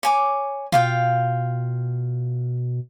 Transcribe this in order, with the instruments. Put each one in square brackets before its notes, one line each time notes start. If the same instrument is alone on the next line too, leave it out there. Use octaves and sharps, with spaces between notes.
[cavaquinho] C#5 G#5 D6
[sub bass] B2 [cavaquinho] F4 F5 G5